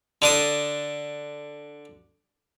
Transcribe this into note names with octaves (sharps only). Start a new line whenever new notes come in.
D3 D4 D#6